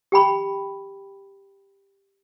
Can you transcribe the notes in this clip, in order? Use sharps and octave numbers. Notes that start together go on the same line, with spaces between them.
G4 G5 B5 C#6